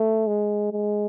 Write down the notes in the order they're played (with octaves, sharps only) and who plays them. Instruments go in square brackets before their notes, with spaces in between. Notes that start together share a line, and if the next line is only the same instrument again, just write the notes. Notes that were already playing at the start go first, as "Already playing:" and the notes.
Already playing: [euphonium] A3
G#3
G#3